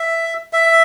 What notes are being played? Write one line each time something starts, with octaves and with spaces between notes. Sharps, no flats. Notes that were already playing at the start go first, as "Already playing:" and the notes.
Already playing: E5
E5